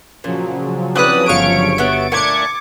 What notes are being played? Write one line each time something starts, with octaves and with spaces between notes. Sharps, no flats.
A#2 C#3 F3 F#3
C4 E4 B4 D5 D#6 F#6
G1 A3 C#5 F5 C#6 D7
F#3 B3 E5 A6
A#2 A3 D4 D6 G#6 C#7